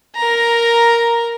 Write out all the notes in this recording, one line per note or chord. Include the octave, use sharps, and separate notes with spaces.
A#4 A#5